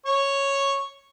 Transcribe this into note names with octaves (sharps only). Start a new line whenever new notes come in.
C#5 C#6